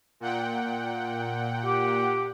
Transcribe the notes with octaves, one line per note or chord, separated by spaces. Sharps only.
A#2 F#5 G5
G4